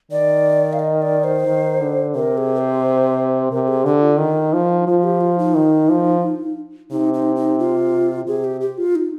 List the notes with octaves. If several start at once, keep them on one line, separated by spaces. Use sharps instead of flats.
D#3 D5
F5
D#5
D5
C5
D#3
D3
C3 A#4
G#4
C5
C3 A#4
G#4
D3 G4
F4
D#3 D#4
F3
F3 F4
G4
F4
D#4
D#3
F3
C3 D#4
D#4
D#4
F4
C3 G#4
G4
G4
F4
D#4